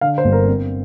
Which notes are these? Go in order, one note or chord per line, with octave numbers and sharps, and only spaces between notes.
D3 F5
C5
G1
A#4
C4